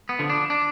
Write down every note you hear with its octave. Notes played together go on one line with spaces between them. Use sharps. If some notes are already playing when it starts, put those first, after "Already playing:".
B3
D3 F3
D4
D4